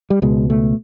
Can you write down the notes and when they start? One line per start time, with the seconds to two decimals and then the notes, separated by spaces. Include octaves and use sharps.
0.10 G3
0.22 C#2 B2 G#3
0.50 A3